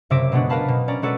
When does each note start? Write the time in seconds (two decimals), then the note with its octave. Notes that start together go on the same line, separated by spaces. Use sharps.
0.10 F#1 C3 E5 D6 A#6 D7
0.32 B2 G#3 B3 D4 F#4
0.49 A#4 B4 F5 A5 B5
0.68 B2
0.88 C#4 D5 A#5
1.02 G#3 F#4 A4 B4 D5